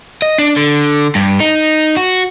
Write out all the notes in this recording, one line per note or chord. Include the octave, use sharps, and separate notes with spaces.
D#5
D4
D3
G2
D#4
F#4